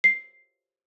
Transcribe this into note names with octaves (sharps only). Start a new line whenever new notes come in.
C7